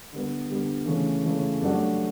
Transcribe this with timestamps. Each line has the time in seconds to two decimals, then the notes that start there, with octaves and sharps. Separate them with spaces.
0.12 D3 G3 B3
0.49 D3 G3 B3
0.86 C#3 E3 A3 C#4
1.24 C#3 E3 A3 C#4
1.61 G2 F#3 A3 D4 F#4